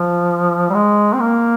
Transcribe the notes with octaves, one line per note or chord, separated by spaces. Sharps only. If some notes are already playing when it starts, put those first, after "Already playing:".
Already playing: F3
G3
G#3
C4
A#3